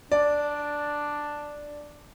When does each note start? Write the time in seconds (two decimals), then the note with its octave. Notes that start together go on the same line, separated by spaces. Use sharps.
0.12 D4 D5